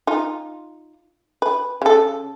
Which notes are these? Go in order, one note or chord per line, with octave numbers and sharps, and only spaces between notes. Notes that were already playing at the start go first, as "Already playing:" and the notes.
D#4 F4
B4
C#3 A4